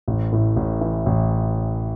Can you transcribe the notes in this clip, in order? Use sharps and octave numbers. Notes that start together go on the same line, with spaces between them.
A1
A2
A1
E3
A1